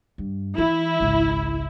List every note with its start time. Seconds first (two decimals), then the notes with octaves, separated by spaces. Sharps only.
0.18 G2
0.58 E3 E4
1.00 G#1 C#2